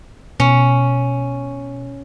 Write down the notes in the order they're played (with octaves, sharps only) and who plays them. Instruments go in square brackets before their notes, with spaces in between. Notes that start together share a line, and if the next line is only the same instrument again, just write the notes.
[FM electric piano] B2 [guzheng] C#4